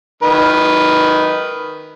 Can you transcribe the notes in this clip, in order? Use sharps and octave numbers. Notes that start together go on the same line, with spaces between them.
D#3 B4